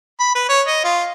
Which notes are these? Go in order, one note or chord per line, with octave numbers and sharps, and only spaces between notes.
B5
B4
C#5
D#5
F4